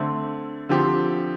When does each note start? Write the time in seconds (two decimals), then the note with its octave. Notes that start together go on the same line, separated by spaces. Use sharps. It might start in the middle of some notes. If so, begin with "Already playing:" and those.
Already playing: D3 A3 C4
0.69 D3 F3 C4 G4